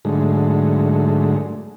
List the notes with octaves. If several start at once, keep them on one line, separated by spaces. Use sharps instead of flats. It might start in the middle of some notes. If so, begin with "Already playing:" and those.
G#2 D3 F#3 G#3 A3